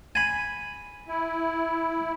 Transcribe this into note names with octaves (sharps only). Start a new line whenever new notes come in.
G#5 B5
E4